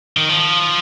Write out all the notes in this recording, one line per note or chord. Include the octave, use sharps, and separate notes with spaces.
D#3
F3